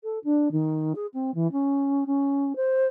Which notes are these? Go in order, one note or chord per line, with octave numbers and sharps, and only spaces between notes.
A4
D4
D#3
G#4
C4
E3
C#4
C#4
C5